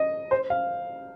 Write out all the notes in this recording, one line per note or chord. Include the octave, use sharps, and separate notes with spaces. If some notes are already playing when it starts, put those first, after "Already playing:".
Already playing: D#5
C5
F5